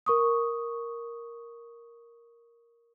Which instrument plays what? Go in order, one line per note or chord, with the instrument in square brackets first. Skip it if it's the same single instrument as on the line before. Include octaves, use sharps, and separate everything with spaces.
[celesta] A#4 C#6 D#6